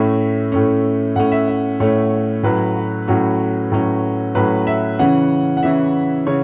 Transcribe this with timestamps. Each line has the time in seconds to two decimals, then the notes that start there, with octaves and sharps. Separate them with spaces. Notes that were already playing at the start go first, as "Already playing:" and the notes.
Already playing: A2 A3 C#4 E5
0.52 A2 A3 C#4
1.16 A2 A3 C#4 F#5
1.32 E5
1.48 E5
1.80 A2 A3 C#4 C#5
2.43 A2 F#3 C#4 B4
2.76 F#4
3.07 A2 F#3 C#4 F#4
3.72 A2 F#3 C#4
4.35 A2 F#3 C#4 B4
4.67 E5
4.99 C#3 E3 C#4 F#5
5.57 F#5
5.63 C#3 E3 C#4 E5
6.27 C#3 C#5